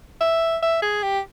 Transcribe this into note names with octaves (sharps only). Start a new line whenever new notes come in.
E5
E5
G#4
G4